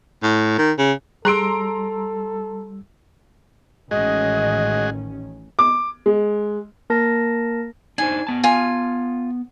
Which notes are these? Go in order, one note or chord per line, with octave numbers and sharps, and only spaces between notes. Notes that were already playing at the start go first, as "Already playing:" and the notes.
A2
D#3
C#3
G3 G#4 A4 A#5 C6 E6 D7
A1 D#3 G#3 C#4 F#4 G#4 D#5
D6
G#3
A#3 A#4 A5 A#6
D4 D#4 C5 G#5
B3 A5
F4 G#5